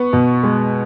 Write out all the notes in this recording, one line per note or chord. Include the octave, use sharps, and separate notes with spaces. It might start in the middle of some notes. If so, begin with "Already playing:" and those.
Already playing: B3 C#6
B2
G#3